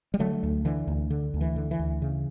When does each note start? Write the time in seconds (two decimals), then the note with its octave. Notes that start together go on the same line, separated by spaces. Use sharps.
0.14 G3
0.19 D3 F#3 A3
0.43 D2
0.65 D3 E3
0.87 D2
1.10 D3
1.34 D2
1.41 E3
1.56 D3
1.71 E3
1.79 D2
2.02 C#3